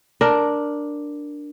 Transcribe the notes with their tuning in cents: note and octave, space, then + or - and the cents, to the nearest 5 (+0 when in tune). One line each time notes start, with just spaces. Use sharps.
D4 +0 A#4 +0